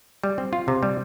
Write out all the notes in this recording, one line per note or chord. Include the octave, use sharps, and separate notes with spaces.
G3
C4
F4
C3
G3